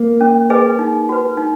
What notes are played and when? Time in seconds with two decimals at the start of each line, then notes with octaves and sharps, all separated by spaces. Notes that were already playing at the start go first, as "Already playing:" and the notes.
Already playing: A#3
0.21 C#4
0.50 G#4 B4 D#5 G#5
0.79 D#4
1.09 F#4 B4
1.37 D#4